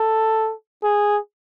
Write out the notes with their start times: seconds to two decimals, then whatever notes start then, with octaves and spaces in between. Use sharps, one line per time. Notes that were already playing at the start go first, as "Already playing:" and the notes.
Already playing: A4
0.83 G#4